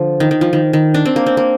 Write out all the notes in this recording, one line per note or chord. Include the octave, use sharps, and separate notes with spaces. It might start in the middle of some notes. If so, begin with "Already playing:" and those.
Already playing: D3 F3
D#3
D#3
F3
D#3
D#3
D4
C4
A#3
C4
A#3